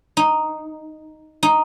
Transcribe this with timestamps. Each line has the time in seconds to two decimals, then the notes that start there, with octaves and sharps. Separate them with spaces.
0.17 D#4
1.43 D#4